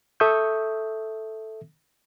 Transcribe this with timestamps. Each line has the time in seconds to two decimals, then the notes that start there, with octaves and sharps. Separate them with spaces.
0.20 A4 E5 C#6 D#6 G6